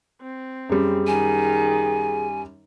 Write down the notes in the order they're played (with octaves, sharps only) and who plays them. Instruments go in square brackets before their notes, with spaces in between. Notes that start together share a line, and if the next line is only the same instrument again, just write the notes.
[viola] C4
[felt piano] F#2 G3 [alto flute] G#4
[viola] D#3 [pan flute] G#5